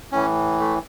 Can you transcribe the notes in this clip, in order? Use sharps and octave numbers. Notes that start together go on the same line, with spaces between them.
A2 E3 C#4
A3